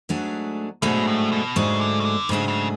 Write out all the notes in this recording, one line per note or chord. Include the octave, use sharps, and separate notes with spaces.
G#2 F#3 A3 D4 G#4
G#2 B2 F#3 A3 D4 G#4
A2
B2
G#2 C#3 F#3 A3 D4 G#4
D3
C#3
D3
G#2 C#3 F#3 A3 D4 G#4
C#3